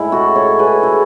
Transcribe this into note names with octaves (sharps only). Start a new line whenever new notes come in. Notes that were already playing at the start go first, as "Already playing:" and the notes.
Already playing: A2 G#3 E4
F#4 A4
A4 C#5
G#4 B4
F#4 A4